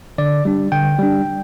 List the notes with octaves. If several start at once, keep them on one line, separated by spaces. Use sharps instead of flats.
D3 D5
G3 D4
D3 G5
G3 D4